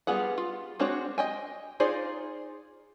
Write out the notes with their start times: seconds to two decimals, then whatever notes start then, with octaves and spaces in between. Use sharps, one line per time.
0.07 G3 B3 F4 G#4 F#5
0.38 F4
0.79 G#3 C4 D4 F#4 C#5
1.18 D#5 G5 G#5
1.80 D#4 F4 G#4 C5 D5